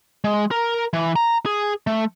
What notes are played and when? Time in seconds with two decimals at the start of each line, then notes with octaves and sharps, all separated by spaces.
0.24 G#3
0.51 A#4
0.93 E3
1.16 A#5
1.46 G#4
1.87 A3